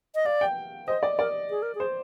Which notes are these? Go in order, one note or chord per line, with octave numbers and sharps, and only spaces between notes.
D#5
D5 F5
G5
C5 D#5
D5
A#4 D5
G#4
A#4
G#4
C5